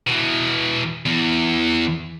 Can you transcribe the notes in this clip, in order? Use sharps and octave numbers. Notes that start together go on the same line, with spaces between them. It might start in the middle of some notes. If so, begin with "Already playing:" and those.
B2 E3
E2